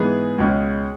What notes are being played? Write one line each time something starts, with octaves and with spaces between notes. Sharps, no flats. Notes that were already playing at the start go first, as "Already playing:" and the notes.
Already playing: G#2 E3 G#3 B3 G#4
C#2 B2 G#3 C#4